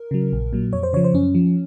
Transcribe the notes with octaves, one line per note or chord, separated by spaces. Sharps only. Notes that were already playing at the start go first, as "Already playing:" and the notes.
Already playing: A#4
C#3 F#3
A#1
A#2 F#3
F2 C#5
C5
C#3 F3 C#5
C5
F#2 C#4
F3